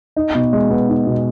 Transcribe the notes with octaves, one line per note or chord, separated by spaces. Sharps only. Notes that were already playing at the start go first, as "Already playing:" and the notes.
D#4
B2
G#3
B3
D#4
B2